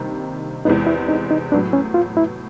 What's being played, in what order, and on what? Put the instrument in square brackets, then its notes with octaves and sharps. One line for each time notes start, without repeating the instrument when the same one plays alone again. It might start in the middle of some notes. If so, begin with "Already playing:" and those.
Already playing: [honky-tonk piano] C3 D#3 G3 A#3 D4
[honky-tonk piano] E2 C3 E3 G#3 B3 [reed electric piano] D#4
[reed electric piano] E4
D#4
D#4
[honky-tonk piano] A2 F#3 B3 [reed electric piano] D4
[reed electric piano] C#4
F4
E4